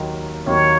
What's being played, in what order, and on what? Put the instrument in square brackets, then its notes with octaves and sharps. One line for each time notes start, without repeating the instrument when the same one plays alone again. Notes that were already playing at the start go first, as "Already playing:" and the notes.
Already playing: [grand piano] D#2 D#3 F#3 A#3
[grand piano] D#2 D#3 F#3 A#3 [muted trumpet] C#5